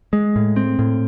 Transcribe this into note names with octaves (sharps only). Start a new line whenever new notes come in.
G#3
A2
C4
A2